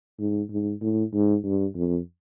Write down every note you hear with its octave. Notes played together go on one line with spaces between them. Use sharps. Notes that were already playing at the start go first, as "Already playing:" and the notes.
G#2
G#2
A2
G#2
G2
F2